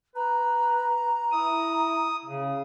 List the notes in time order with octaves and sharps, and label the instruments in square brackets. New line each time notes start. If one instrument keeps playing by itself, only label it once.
[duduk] B4 [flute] A#5
[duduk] E4 [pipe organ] D#6
[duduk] C#3